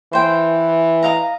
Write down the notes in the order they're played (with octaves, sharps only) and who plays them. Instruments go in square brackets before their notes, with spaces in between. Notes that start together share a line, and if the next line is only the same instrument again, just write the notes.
[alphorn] E3 [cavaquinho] C5 G5
[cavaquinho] D#5 F5 A#5